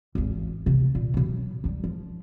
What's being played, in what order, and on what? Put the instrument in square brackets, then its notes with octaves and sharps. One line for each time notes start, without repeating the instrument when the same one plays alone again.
[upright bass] G#1 E2
C3 A3
A#2
B2 F#3
F#3 G3
F3